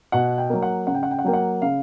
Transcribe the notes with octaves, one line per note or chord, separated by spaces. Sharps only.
B2 F#5
G5
F#3 A#3
F#5
C#3 F#5
G5
F#5
G5
F#5
F#3 A#3 G5
F#5
C#3 F5